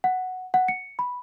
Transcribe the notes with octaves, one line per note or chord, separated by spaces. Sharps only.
F#5
F#5
C#7
B5